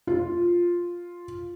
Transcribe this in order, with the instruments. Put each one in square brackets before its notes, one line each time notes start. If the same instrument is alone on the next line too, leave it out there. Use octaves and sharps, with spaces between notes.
[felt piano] F4